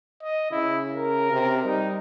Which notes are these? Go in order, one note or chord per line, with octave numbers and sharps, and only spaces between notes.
D#5
C#3 E4
A#4
C3
G3 D#4